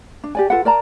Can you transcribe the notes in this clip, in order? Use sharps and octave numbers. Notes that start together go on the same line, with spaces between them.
D4
G4 D5 G#5
F4 A4 B4 F#5
A#4 D5 A5 A#5